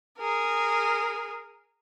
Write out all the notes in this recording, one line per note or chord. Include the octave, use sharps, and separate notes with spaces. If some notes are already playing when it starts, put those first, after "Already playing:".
G#4 A#4